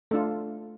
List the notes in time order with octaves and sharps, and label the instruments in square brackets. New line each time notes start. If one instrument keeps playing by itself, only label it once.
[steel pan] A3 D4 F4 A4